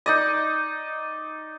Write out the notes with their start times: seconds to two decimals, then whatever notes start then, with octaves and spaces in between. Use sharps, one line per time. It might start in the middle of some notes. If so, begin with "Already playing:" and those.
0.06 D#4 D5 D#5